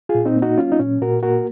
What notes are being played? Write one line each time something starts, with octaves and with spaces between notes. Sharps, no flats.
F4 G#4
A#2
C4 D#4
A#3
D#4 F#4
F#3 C#4 F4
D#4
A#2 C#4
A#2 F#4 A#4
A#3 F#4 A#4